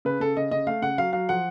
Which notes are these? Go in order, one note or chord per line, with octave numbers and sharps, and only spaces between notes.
C#3 B4
C#3 A4
C#3 D#5
C#3 D#5
A3 F5
C#3 F#5
F#3 F5
F#3 F5
F3 F#5